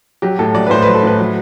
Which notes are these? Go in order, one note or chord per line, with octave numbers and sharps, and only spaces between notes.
F#3 G4
A2 A4
F#3 D5
B4
A2 C5
B4
F#3
A4
A2 B4
F#3